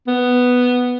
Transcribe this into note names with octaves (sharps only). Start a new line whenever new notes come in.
B3